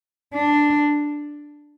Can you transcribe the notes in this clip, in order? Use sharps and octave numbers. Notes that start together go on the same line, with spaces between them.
D4